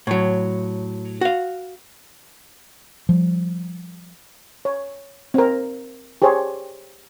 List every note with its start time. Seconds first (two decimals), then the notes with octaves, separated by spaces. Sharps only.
0.07 A2 F#3
1.21 F#4 F5
3.09 F3 G3
4.65 C#5
5.34 C4 A#4
6.22 G4 G#4 C5 C#5